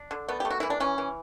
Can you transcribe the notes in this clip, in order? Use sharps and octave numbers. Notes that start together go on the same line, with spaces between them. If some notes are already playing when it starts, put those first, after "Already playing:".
Already playing: D4
D3
A3 B3
A3 G4
F#4
E3 E4
D4
E3 C#4
E3